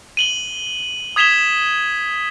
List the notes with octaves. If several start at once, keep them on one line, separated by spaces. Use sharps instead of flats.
D#7 F#7 G7
D#6 G#6 B6 E7 F7 G7